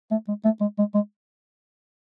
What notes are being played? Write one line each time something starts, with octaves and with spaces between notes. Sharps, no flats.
A3
G#3
A3
G#3
G#3
G#3